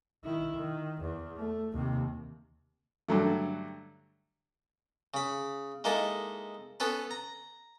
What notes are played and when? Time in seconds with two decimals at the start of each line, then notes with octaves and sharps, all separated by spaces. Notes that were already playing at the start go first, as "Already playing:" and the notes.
0.24 D#3 E4
0.56 D#3
1.02 E2
1.37 A3
1.73 D#2 C3
3.08 G2 D3 F#3 A3
5.14 C#3 B5
5.84 G#3 A#3 D#4 E4 A4
6.80 B3 C#4 A4 B4
7.11 A#5